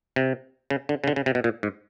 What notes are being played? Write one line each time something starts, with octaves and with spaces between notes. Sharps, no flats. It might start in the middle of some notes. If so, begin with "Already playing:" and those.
C3
C#3
D3
C#3
D3
C#3
C3
B2
A#2
G#2